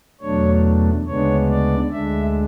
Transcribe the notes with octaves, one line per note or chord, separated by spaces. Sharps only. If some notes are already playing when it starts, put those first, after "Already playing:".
E2 B2 F#3 A3 D4 C#5
D2 C#3 G#3 B3 D4 C#5
D5
D2 D3 G#3 D4 E5